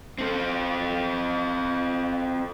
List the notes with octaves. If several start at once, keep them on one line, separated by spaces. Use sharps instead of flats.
C4 A4